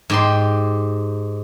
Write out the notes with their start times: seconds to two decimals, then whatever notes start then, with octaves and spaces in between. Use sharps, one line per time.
0.10 G#2 G4 C6